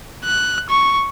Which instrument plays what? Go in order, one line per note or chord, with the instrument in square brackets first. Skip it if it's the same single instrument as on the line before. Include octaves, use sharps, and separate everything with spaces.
[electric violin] F#6
C#6